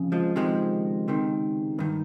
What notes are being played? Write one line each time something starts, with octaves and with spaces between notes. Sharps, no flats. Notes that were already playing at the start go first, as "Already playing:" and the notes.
Already playing: F2 C#3
F3 G#3
C#2 C3 D#3 F3 G#3
C#2 C3 D#3
G2 D#3